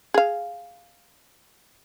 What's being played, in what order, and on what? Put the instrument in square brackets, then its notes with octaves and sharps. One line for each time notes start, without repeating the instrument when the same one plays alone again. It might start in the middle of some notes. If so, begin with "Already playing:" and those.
[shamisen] G#4 F5